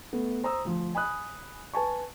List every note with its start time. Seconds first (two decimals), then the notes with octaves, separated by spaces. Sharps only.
0.13 A3 B3
0.44 C5 A#5 D#6 E6
0.65 D2 F3
0.95 G#5 B5 D#6 F#6
1.74 B4 G#5 A5 C#6